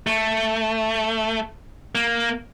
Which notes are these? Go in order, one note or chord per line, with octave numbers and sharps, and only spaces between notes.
A3
A#3